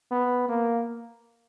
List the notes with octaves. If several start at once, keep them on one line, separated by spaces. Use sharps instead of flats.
B3
A#3